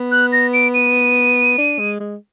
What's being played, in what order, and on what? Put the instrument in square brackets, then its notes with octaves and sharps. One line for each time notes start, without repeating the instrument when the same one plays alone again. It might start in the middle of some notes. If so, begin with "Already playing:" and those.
Already playing: [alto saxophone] B3
[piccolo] F#6
A#6
D7
D#7
[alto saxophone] D4
G#3
G#3